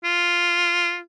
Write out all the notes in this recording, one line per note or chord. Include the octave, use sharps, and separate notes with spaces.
F4